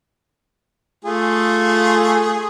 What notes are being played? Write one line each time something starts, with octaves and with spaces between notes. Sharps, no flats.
A3 F4 G#4